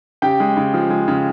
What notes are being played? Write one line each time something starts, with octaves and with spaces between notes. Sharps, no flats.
C#3 G4 G5
G#3
C#3
F3
G#3
C#3